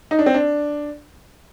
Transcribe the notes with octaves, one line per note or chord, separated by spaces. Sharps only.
D#4
D4
C4
D4